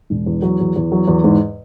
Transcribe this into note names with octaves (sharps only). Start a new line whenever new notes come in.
E1
E2
F#3
E2
E2
F#3
E2
G#2